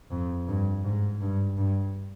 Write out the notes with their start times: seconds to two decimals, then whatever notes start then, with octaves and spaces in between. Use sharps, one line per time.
0.10 F2
0.47 G2
0.84 G#2
1.20 G2
1.57 G2